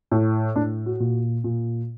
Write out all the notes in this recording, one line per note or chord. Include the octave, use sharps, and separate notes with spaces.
A2
A2 D4
F#4
A#2
A#2